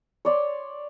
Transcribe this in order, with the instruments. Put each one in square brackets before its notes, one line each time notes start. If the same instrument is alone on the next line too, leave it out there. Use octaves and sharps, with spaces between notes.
[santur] C#5 D5 C6